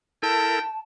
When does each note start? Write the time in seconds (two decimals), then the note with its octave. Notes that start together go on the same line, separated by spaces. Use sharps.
0.23 E4 A4 A#4 G5 A5